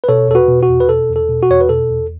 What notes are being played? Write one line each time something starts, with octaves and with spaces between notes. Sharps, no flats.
B4
B2 A4 C#5
E2 A4
F#4 B4
B2
F#4
E2
B4
B2 A4
E2
A4
B2
F#4
E2 C#5
B4
B2 A4
E2